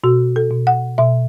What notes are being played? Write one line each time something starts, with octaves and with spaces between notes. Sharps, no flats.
B2 F#4
A4
B2
F#5
B2 E5